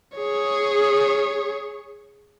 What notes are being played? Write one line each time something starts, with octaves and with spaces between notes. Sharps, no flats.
G#4 C#5